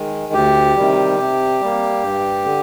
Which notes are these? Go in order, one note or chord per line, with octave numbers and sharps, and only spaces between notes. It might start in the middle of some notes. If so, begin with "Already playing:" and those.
Already playing: D#3 G#3
D2 G4
C3 D#3 G3
C3
G3 A#3
G2
D3